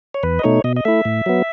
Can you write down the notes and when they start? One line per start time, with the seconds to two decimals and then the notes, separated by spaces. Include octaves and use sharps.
0.14 C#5
0.23 E2 B4
0.39 D#5
0.43 B2 A3 D#4 C#5
0.64 B2 D#5
0.76 D#5
0.85 A3 E4 E5
1.05 A2
1.26 F#3 B3